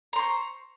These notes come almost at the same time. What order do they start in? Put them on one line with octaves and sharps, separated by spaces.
A#5 C5 C#6